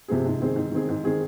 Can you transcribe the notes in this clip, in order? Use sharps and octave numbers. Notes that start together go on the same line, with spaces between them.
C3 F3 C4 G#4
G#2
D#3 C4 G#4
G#2
D#3 C4 G#4
G#2
D#3 C4 G#4